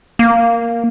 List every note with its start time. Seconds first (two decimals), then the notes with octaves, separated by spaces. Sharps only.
0.19 A#3